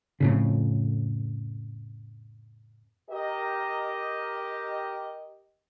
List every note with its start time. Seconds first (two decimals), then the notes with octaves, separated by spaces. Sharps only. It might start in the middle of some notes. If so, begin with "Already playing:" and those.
0.20 F2 A2 C#3
3.11 G4 A#4 D#5